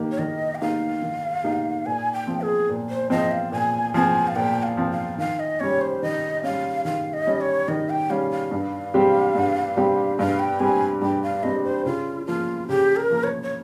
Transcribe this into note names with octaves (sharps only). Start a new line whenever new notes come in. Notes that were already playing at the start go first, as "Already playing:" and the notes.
Already playing: D#3 A#3 D#4 G4
C#5
D#3 D#5
G5
A#3 D#4 G4 F5
D#3
A#3 D#4 G4
A#2 G#5
G5
F3 C4
G#4
A#2
C5
F3 C4 D#5
F5
A#2 G#5
F3 C4 G#5
F5
A#2 G5
F5
F3 C4
F5
D#3 F5
D#5
G3 C#4 C#5
C5
D#3 D#5
G3 C#4 F5
D#3 F5
D#5
G3 C#4
C#5
D#3 D#5
G5
G3 C#4 F5
F5
G2
G3 C4 G4
G2
G3 C4 G4
G2 F5
G5
G3 C4 G4 G#5
G2 G5
F5
G3 C4 G4 D#5
C5
C#3 F4
F3 A#3 F4
C#3 G4
A#4
F3 A#3
C#5
C#5